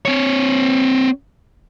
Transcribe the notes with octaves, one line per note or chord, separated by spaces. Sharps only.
C4 C#5